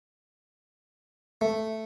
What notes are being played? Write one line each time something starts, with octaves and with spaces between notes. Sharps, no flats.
A3